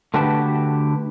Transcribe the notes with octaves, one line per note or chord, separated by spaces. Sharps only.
D3 A3 F#4 G4 B4 A5